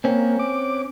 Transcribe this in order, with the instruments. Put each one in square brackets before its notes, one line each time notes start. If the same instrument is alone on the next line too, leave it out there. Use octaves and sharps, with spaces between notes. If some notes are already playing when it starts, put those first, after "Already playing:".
[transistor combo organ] A#3 [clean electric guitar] C4 C#4
[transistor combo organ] D6